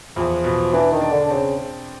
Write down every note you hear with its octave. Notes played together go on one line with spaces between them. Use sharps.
E2 F3
B2
E3 D4
D#3
D4
D3
D3
C#3 C4